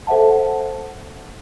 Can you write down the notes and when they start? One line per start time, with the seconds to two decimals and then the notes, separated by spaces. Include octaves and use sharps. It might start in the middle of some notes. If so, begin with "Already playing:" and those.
0.07 A4 C5 E5 F#5 A5